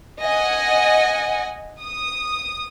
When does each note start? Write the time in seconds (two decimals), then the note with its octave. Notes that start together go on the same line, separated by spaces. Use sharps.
0.21 D#5 F#5 G#5
1.82 D#6